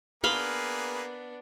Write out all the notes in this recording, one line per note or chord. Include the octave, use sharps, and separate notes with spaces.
A#3 B3 D4 G#4 B4 F5 B5 C6